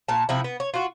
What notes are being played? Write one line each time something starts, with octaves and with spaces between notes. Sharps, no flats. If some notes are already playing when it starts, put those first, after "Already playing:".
A#2 A5
C3 F3 E4
B3
C#5
F4 F#4